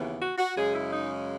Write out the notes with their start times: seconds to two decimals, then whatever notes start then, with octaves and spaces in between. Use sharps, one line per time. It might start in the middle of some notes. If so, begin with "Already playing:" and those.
Already playing: D#2 C#3 E3 B3
0.20 F#4
0.38 F#4
0.56 F#2 C#3 G#3 G#4
0.75 E4
0.93 D#4